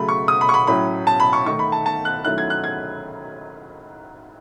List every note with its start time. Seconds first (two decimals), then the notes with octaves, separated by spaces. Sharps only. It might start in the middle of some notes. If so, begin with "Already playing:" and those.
Already playing: C#3 F#3 A3 B5
0.09 C#6
0.28 D#6
0.41 B5
0.49 C#6
0.54 B5
0.67 A2 F#3 C#4 E4 B5
1.07 A5
1.20 B5
1.33 C#6
1.46 D#3 A3 D#4 C#6
1.59 B5
1.72 A5
1.86 A5
2.05 F#6
2.25 D#3 F#3 A3 C#4 E4 F#6
2.38 G#6
2.50 F#6
2.64 G#6